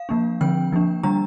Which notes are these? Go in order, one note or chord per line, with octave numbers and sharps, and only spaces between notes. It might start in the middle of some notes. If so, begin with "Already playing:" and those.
Already playing: F5
F3 A#3 D4
D3 F3 C4 G5
F3 A#3 D4
D3 G3 D4 A#5